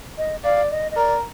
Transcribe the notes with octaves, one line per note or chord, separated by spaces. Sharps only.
D#5
D5 F5
D#5
D#5
A#4 D5